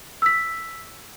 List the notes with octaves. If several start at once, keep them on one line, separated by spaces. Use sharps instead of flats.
E6 B6